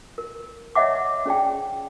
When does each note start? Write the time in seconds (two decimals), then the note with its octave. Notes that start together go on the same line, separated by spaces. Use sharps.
0.18 A#4
0.76 C#5 D#5 E5 F#5 D6
1.26 C#4 G#4 D5 G5